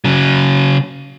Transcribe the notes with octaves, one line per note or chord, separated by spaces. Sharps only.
C#3 F#3